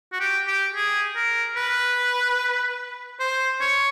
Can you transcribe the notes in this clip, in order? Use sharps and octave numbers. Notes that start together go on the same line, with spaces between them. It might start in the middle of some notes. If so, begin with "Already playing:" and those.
F#4
G4
G4
G#4
A#4
B4
C5
C#5